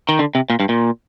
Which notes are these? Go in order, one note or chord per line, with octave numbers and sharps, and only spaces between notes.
D#3
D3
C3
A#2
G2
A#2